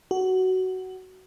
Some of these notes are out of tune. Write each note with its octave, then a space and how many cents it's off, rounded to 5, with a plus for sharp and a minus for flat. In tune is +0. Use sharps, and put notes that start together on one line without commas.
F#4 +15